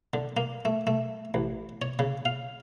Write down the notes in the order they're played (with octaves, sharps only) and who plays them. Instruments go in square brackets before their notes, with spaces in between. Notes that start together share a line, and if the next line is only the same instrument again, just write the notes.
[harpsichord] D3
A#3
A3
A3
A1
C#5
C#3
F5